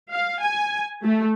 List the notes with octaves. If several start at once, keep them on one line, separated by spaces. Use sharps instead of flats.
F5
G#5
A3